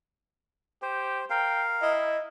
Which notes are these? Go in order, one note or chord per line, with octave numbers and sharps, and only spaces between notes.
G4 C5
A#4 F5 G5
E4 D#5